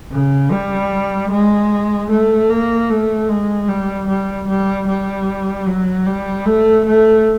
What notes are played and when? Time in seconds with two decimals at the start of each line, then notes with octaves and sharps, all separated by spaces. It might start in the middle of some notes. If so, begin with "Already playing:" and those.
0.12 C#3
0.52 G3
1.31 G#3
2.10 A3
2.50 A#3
2.89 A3
3.28 G#3
3.68 G3
4.08 G3
4.48 G3
4.87 G3
5.67 F#3
6.06 G3
6.46 A3
6.85 A3